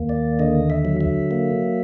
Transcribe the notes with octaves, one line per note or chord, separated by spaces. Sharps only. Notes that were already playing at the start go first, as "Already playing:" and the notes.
Already playing: D#2 A#3
D5
D3 D#5
E5
F#3
E5
A#3